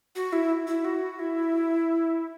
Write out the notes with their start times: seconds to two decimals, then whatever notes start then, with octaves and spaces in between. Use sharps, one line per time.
0.16 F#4
0.33 E4
0.67 E4
0.85 F#4
1.19 E4